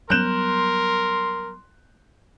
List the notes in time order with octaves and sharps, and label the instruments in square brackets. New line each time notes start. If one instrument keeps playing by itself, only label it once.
[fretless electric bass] F#3 G3 B3 [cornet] A#4 [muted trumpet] C6 [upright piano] F#6 G6 E7